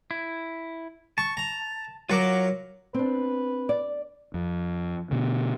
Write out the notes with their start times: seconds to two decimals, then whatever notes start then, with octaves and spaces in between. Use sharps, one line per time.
0.11 E4
1.18 A5 C#6
1.37 A#5
2.10 F#3 F4 A#4 F#5 D6
2.94 C4 D4 B4
3.69 D5
4.34 F2
5.11 B2 D3